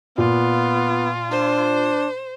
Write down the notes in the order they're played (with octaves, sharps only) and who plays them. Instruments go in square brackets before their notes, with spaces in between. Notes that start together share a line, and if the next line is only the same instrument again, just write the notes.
[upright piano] A#2 [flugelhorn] B3 [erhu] F4
[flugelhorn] D4 [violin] C5